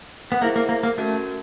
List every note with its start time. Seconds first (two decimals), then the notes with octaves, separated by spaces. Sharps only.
0.32 B3
0.41 A#3 E4 G#4 C5 E5
0.56 A#3
0.69 A#3
0.83 A#3
0.98 A3 C#4 F#4 A#4